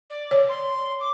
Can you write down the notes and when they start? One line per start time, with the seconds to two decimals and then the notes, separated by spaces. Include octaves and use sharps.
0.10 D5
0.31 C#5
0.49 C6
1.00 D6